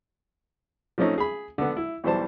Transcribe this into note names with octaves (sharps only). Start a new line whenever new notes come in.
F3 A3 C4 C#4 D#4
G#4 B5
D3 B3
E4
B1 E3 G3 C5 A5